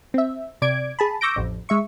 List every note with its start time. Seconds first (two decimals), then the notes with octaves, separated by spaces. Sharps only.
0.14 C4 E5
0.62 C3 D5 G#6 D7
0.99 G#4 A5 B5
1.21 C#6 D6 E6 G6 A#6 D7
1.36 A1 F2
1.69 G#3 E5 C#6